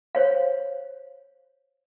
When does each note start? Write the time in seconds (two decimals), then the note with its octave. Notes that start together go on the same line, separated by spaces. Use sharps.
0.15 C5 C#5 F5